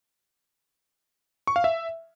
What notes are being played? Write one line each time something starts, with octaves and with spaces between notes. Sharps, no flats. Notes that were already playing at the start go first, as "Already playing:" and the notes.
C#6
F5
E5